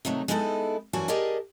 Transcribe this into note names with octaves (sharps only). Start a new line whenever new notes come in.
C3 D#3 F#3 A3 D#4
G#3 B3 D#4 E4 G#4 A4
F#2 E3 G3 F#4 G#5 A5
G4 G#4 A#4 D5 D#5 A5